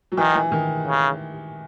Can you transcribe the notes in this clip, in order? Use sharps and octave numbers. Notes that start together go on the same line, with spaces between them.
F#3
D#3 E3
E3
D#3
C#3